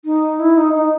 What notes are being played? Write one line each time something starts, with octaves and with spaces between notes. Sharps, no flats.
D#4
E4
D#4
D#4